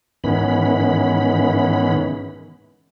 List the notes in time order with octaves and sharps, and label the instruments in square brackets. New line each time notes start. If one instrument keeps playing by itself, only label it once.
[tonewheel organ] G#2 D#3 E3 B3 C#4 B5